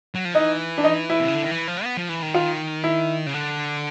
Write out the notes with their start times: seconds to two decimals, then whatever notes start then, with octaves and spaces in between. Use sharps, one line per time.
0.15 F#3
0.25 F3
0.34 E3 D#4
0.78 D4
0.84 D#4
1.10 E4
1.20 C3
1.28 C#3
1.35 D3
1.43 D#3
1.51 E3
1.68 F3
1.84 B3
1.97 F3
2.09 E3
2.22 D#3
2.34 F4
2.84 E4
3.26 C#3
3.34 D3